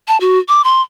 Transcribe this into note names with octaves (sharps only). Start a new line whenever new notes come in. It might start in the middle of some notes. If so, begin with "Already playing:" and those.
A5
F#4
D6
C6